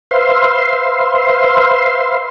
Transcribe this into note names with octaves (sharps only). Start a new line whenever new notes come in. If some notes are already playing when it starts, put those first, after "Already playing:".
B4 C5 E5 F5 C6